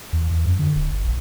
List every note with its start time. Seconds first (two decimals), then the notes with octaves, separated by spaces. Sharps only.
0.13 E2
0.31 E2
0.45 F#2
0.59 D3
0.76 D1
0.92 F#1
1.04 A#1